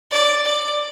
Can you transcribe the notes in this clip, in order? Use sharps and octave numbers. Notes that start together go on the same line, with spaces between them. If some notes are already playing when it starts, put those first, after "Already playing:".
D5
D5